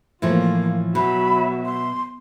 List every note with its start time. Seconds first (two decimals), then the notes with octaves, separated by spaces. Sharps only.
0.22 A2 E3 F3 A#3 F4
0.95 B2 F#3 E5 B5
1.65 C6